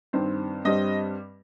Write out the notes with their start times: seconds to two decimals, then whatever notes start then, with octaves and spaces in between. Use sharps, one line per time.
0.13 G2 D#3 C4
0.65 G2 G3 C4 D#5